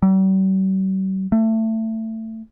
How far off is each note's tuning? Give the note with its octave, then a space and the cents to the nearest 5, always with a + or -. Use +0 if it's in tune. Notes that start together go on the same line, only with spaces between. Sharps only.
G3 -45
A3 +20